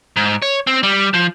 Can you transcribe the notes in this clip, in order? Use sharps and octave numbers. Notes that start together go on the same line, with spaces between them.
G#2
C#5
C4
G3
F3